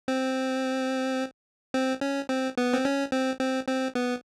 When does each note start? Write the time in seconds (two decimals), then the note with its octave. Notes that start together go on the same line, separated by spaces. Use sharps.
0.08 C4
1.74 C4
2.01 C#4
2.29 C4
2.57 B3
2.74 C4
2.85 C#4
3.12 C4
3.40 C4
3.68 C4
3.95 B3